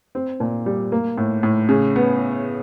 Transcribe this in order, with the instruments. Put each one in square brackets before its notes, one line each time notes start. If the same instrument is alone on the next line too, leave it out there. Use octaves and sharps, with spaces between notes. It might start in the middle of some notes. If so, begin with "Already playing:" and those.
[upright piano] C4
A#2
G3
A#3
A2
A2
C#3
B3